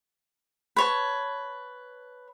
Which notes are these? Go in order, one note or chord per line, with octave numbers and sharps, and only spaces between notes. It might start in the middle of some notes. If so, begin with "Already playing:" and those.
B4 C#5 A5